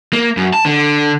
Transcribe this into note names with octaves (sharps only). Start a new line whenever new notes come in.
A#3
F#2
A5
D3